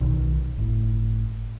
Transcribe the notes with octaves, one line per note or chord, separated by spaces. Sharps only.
B1 B2 D#3
G1 A2